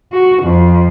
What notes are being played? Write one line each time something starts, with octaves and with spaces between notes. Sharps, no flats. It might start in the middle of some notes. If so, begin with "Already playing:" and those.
F#4
F2